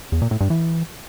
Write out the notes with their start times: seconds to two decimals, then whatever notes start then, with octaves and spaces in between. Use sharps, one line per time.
0.12 E2
0.22 A#2
0.31 A2
0.41 G2
0.50 E3